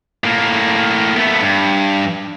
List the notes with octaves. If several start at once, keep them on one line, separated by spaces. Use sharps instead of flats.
A2 A#3
A3 B3
G2